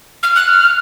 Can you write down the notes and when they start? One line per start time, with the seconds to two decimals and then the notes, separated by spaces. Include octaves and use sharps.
0.23 F6
0.35 F#6
0.48 F6